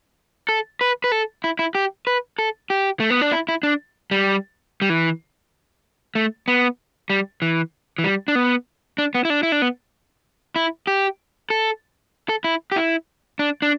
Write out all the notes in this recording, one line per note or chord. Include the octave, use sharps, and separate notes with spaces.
A4
B4
B4
A4
E4
E4
G4
B4
A4
G4
A3
B3
D4
E4
E4
D4
G3
G3
E3
A3
B3
G3
E3
E3
G3
D4
B3
D4
B3
E4
D4
E4
D4
B3
E4
G4
A4
A4
E4
G4
E4
D4
D4